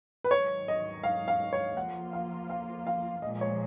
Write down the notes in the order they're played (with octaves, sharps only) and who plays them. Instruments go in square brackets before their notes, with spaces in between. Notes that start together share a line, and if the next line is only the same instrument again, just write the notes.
[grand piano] B4
[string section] G#2 D#3 F#3 [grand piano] C#5
[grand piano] D#5
F5
F5
C#5
[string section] F3 A#3 F4 [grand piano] F#5
[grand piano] F5
F5
F5
[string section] A#2 F3 G#3 [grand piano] D#5
[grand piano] C#5